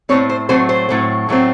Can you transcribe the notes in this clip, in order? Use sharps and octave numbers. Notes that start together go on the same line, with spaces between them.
A2 F#3 A3 C4 C#5
C5
A2 F#3 A3 C4 C5
C5
A2 F#3 A3 C4
A2 F#3 A3 C4